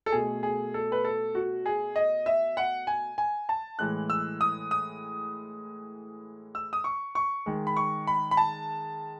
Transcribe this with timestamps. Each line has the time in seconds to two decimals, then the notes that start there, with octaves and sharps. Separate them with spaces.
0.06 A4
0.12 B2 A3 G#4
0.43 G#4
0.74 A4
0.92 B4
1.04 A4
1.35 F#4
1.66 G#4
1.96 D#5
2.26 E5
2.57 F#5
2.87 G#5
3.18 G#5
3.49 A5
3.79 A2 E3 G#3 F#6
4.10 E6
4.41 D#6
4.71 D#6
6.55 E6
6.73 D#6
6.84 C#6
7.15 C#6
7.46 D#3 G#3
7.67 B5
7.77 C#6
8.07 B5
8.31 B5
8.37 A5